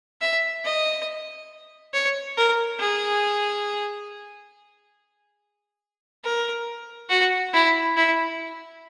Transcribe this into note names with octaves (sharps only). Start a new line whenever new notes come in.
E5
D#5
C#5
A#4
G#4
A#4
F#4
E4
E4